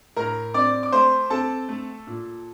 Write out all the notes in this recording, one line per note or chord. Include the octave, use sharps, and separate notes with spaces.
A2 A#4 A#5
C4 D5 D6
D6
A3 C5 C6
C4 A4 A5
A3
A#2